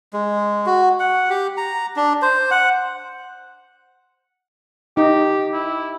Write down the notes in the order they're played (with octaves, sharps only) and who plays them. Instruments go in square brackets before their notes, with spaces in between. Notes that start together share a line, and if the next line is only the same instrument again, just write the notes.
[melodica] G#3
F#4
F#5
G4
A#5
D4
C5
F#5
[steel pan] D#4 [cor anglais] G4
[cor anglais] E4